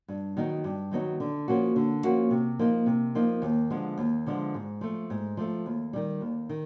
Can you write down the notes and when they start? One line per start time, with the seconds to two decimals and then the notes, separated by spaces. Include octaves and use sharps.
0.08 G2
0.37 D#3 F#3 B3 D#4
0.64 G2
0.91 D#3 F#3 B3 D#4
1.20 D3
1.48 F3 A#3 C#4 F#4
1.76 D3
2.04 F3 A#3 C#4 F#4
2.30 C3
2.59 F3 A#3 D#4
2.86 C3
3.15 F3 A#3 D#4
3.42 D#2
3.70 D3 F3 G#3 B3
3.98 D#2
4.26 D3 F3 G#3 B3
4.54 G#2
4.81 F3 A3
5.10 G#2
5.37 F3 A3
5.66 D#2
5.93 D#3 G3
6.21 D#2
6.49 D#3